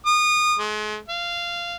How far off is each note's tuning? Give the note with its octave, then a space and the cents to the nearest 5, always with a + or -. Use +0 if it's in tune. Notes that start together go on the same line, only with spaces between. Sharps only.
D#6 -30
G#3 +40
F5 -15